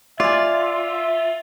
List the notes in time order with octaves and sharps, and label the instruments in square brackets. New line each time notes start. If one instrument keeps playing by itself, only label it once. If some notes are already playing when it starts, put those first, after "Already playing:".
[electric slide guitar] F4 [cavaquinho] D5 G#5 [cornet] E5